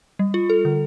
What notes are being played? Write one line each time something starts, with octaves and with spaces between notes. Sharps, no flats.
G3
F4
A4
D3